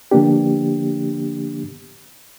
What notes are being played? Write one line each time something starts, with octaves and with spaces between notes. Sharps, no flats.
D3 F3 A#3 B3 D4 G4